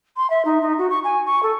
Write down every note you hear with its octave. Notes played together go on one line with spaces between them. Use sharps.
C6
E5
D#4
D#4
F#4
C#6
G#5
C#6
A4